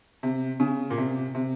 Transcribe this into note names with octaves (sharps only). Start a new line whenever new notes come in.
C3
C#3
A#2
C3
C3